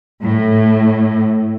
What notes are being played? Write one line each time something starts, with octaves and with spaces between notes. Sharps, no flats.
A2